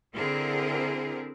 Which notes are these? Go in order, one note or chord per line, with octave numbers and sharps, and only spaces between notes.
D3 C4 E4 G#4 A#4